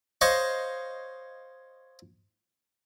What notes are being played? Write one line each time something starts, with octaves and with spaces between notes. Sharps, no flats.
C5 C#5 D#5 F5 C#6